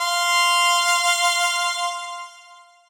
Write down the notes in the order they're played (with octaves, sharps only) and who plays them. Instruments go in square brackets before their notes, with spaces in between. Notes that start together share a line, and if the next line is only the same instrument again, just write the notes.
[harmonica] F5 C6